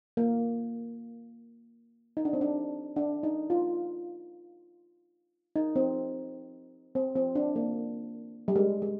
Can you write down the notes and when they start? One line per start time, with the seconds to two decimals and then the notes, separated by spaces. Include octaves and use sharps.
0.17 A#3
2.17 D#4
2.25 D4
2.33 C4
2.41 D4
2.96 D4
3.23 D#4
3.50 F4
5.56 D#4
5.76 C4
6.95 C4
7.16 C4
7.35 D4
7.56 A#3
8.48 G3
8.56 G#3
8.82 G#3